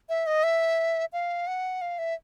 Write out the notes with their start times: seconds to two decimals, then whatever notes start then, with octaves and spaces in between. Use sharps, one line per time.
0.09 E5
0.26 D#5
0.43 E5
1.13 F5
1.47 F#5
1.81 F5
1.98 E5